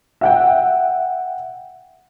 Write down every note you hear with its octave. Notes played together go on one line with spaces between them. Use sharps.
E5 F#5 G5